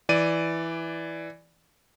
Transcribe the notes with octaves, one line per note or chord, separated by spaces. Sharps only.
E3 D5 D#7